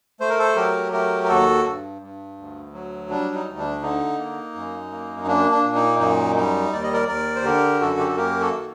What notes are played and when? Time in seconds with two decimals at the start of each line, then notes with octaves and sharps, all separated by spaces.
0.20 A3 C5
0.29 A#4
0.39 A4 C5
0.56 F#3 G4 A#4
0.92 A3 G4 A#4
1.23 A#4
1.28 D#2 F#4 A4
1.65 G2
2.02 G2
2.38 D2
2.73 F#3
3.10 G3 D4
3.34 D#4
3.46 D2
3.58 D4
3.82 D3 D#4
4.18 A#3
4.55 F#2
4.91 A#3
5.20 D#4
5.27 A#3 D4
5.51 D4
5.63 A#2
5.75 D#4
5.99 F#2 D#4
6.36 G3 D#4
6.72 D#2 D5
6.83 D#5
6.93 A#4 D5
7.08 D#2 A#4 D5
7.35 C5
7.44 D3 G4 A#4
7.80 F#2 F#4 A4
7.99 G4
8.08 A4
8.16 A#3 G4 A#4
8.41 F#4 A4
8.53 D#3